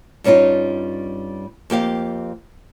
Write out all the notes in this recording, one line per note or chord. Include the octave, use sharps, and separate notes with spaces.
G2 G3 C#4 D#4 F4
F2 A#3 G4 F5